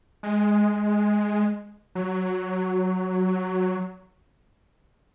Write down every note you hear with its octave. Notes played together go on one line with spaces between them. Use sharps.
G#3
F#3